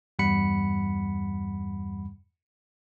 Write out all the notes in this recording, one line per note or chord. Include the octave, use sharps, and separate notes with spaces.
E2 G2 G3 F#5 B5 C#7